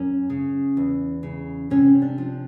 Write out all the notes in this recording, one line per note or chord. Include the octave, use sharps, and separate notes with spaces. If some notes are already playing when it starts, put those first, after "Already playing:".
Already playing: F#2 C#4
C#3
E2
C#3
C3 C#4
D4
F3